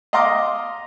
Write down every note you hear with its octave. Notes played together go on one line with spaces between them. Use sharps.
D#5 F5 A#5 C6 D6 F6